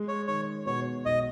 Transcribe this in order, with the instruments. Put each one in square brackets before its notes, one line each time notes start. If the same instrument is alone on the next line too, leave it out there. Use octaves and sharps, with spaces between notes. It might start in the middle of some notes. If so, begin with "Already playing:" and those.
Already playing: [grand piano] G#3
[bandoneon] C#5
[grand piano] D#3 [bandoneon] C#5
[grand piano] B2 [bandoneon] C#5
[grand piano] B1 [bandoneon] D#5